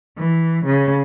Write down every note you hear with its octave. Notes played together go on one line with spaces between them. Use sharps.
E3
C#3